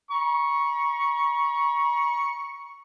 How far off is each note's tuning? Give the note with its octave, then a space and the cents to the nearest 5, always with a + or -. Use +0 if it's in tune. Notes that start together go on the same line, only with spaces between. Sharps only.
A#5 +45 C#6 +0